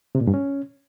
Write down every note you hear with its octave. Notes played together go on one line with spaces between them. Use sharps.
C3
A#2
G2
C#4